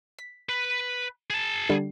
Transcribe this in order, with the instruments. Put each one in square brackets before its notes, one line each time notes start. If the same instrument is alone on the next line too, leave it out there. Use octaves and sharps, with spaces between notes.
[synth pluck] B6
[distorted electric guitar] B4
G#4 A5
[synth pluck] D3 G3